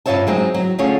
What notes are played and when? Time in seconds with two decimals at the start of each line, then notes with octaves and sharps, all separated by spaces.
0.06 G2 A#2 F4 C#5 E5 A5
0.27 F#3 G#3 C4 D#4
0.54 F#3
0.78 D3 A3 C#4 F4 G#4 C#5